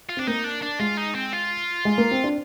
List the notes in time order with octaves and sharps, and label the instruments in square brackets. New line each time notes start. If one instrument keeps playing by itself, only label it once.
[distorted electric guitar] F4
[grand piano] C4 [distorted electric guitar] D4
[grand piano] A#3 [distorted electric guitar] D#4
[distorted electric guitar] D4
D4
[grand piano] G#3 [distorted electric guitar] F4
[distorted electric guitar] D#4
C4
F4
[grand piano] G#3
A#3
C4
D4